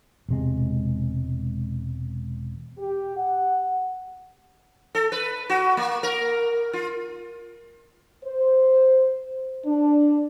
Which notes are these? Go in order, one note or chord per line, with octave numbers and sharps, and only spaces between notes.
E1 C3 G#3
G4
F#5
A4
B4
F#4
A#3
A#4
F4
C5
D4